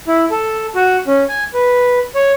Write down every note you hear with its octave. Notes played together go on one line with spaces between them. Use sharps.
E4
A4
F#4
C#4
G#5
B4
C#5